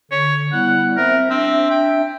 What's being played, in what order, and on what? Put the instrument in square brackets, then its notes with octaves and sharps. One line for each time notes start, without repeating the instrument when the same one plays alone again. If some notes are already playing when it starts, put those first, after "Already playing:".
[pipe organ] D3 [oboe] C#5
[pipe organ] G3 B3 E4 [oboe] F#5
[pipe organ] C4 C5 E5 [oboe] A#4
[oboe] C4 [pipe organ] D4 E5
[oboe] G5